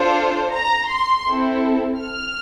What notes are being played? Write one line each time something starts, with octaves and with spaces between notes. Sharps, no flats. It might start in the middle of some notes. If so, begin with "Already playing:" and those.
Already playing: D4 F4 A4 C5
A#5
C6
C4 E4 A4
F6